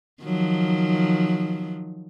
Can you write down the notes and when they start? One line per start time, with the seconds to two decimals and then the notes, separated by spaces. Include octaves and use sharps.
0.23 D#3 F3 F#3